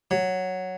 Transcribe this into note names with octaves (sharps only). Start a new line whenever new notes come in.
F#3